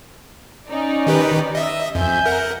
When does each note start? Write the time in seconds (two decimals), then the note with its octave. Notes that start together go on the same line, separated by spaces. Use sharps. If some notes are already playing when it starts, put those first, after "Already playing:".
0.68 C#4 D#4 D5
1.07 D#3 G4 B4
1.55 D#5 E5
1.95 F2 E5 G#5 G6
2.26 A#4 F#5